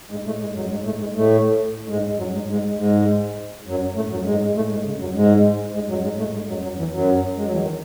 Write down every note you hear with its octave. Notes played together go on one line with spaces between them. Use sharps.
G#2 G#3
A2 A3
G#2 G#3
F#2 F#3
G#2 G#3
A2 A3
G#2 G#3
A2 A3
G#2 G#3
F#2 F#3
G#2 G#3
G#2 G#3
G#2 G#3
F#2 F#3
A2 A3
F#2 F#3
G#2 G#3
A2 A3
G#2 G#3
C#3
F#2 F#3
G#2 G#3
G#2 G#3
F#2 F#3
G#2 G#3
A2 A3
G#2 G#3
F#2 F#3
F#2 F#3
E2 E3
F#2 F#3
G#3
F#3
E2 E3
D#3